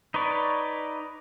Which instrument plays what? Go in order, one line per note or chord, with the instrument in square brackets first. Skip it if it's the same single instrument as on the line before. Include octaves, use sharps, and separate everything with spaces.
[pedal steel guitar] D#4 B4 C#5 D5